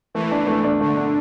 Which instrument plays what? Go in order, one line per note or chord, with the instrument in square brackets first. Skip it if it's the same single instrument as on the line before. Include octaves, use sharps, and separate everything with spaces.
[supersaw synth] E3 [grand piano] A3
[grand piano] D4
A3
D4
[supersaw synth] D3 [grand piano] A3
[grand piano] D4